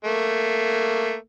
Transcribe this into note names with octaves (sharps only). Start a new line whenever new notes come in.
A3 A#3